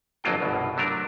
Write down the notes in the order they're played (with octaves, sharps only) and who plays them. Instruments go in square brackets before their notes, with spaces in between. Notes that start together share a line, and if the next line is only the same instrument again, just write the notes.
[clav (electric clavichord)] G1 F2 F#3 A#3 F4 G5
G1 C2 B2
C3 F#3 A3 D4 A#4